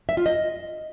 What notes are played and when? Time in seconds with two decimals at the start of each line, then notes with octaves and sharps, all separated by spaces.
0.09 E5
0.17 F4
0.26 D#5